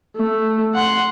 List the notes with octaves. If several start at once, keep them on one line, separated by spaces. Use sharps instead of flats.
A3
F#5 C6